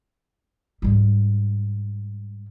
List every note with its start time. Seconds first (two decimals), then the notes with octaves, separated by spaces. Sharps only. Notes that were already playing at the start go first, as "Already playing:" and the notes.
0.82 G#2 G3